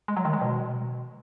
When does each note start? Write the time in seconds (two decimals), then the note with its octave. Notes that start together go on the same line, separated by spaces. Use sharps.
0.08 G#3
0.17 F#3
0.25 D#3
0.33 G#3
0.41 B2